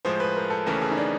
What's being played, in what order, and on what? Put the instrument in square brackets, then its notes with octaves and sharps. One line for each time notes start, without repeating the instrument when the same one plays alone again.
[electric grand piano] A2 F3 G#3 [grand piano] C5
[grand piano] B4
A#4
A4
[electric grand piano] D#2 C#3 E3 A3 C#4 [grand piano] A#4
[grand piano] G#4
D#4
D4